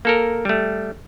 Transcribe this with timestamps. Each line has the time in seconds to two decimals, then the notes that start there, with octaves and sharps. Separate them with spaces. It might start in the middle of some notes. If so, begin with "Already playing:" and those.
0.05 A#3 A4 A#4
0.45 G3 A3